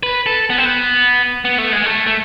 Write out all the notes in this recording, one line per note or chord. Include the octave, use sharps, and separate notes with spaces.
B4
A4
B3
C4
B3
B3
A3
G#3
A3
A3